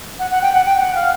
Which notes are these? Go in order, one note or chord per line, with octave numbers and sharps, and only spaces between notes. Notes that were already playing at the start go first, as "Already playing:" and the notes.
F#5
F#5
G5
F#5
G5
F#5
F5